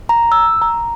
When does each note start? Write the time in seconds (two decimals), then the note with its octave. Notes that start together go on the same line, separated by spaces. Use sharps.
0.09 A#5
0.32 E6
0.62 A#5